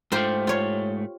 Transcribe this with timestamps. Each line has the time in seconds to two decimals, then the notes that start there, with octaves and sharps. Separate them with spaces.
0.12 G#2 A3 F4 G4 C5
0.47 F4 C#5